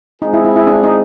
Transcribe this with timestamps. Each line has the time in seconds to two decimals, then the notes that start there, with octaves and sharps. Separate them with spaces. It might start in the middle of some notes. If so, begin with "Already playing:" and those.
0.22 G#3 C4 D#4 F4 G#4
0.33 E4
0.45 E4
0.56 E4
0.67 D4
0.84 D#4